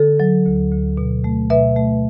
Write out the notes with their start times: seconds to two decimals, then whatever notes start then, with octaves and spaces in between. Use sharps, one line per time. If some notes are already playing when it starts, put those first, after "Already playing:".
Already playing: D3 A4
0.20 F#3
0.46 D2
0.72 D2
0.97 B2
1.24 A3
1.50 B2 B4 E5
1.76 A3